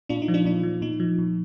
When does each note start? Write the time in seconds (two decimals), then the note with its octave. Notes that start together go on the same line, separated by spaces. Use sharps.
0.09 A#2 D4 F4
0.22 D#4
0.28 F3
0.34 D4 F4
0.45 A#2 D4
0.63 F3
0.81 A#2 D#4
1.00 F3
1.18 A#2